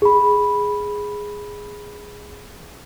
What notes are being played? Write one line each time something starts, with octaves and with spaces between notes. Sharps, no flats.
G#4 B5